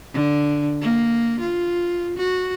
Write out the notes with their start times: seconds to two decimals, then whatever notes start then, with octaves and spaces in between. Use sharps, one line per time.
0.13 D3
0.81 A#3
1.40 F4
2.17 F#4